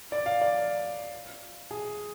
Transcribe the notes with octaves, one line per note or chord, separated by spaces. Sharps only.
D5
F5
D5
G#4